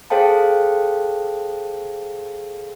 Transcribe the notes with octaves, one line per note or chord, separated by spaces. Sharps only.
G#4 A4 C5 F5 G5 A5